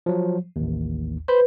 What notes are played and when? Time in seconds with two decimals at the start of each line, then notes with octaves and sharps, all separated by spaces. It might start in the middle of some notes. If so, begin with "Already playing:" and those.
0.06 F3 F#3
0.56 A1 D#2
1.28 B4 C5 B5 G6